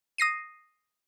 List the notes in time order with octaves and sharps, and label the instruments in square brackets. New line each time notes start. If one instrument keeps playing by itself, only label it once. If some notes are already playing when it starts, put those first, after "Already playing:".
[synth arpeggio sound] D#6 A#6 C7 D#7